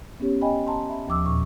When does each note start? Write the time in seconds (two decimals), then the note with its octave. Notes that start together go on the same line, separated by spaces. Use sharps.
0.20 B3 C#4 G4 C#5
0.41 D#5 G5 G#5 B5
0.67 A5 A#5 C6
0.89 E5 B5
1.08 D#2 F3 D6 E6
1.24 E2 A#2 C#6